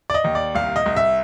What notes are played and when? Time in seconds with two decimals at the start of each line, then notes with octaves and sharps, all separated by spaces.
0.10 D5
0.14 D#5
0.24 D#2
0.35 D5
0.55 C2 F5
0.76 D#5
0.86 C2
0.96 E5